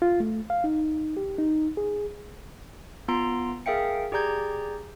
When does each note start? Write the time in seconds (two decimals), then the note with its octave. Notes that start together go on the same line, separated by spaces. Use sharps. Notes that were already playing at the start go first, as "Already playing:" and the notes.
0.02 F4
0.20 A3
0.50 F5
0.64 D#4
1.17 G4
1.38 D#4
1.77 G#4
3.08 B3 F4 A#5 C6 D7
3.66 G#4 A#4 E5 F5 G5 C#7
4.12 G4 G#4 D5 A#5 G6 G#6